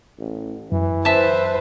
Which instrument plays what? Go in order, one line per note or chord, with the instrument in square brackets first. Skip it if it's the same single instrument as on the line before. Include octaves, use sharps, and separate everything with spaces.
[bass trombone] A1
[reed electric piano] F#2 [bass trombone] E3
[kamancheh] B4 C5 [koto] E5 A5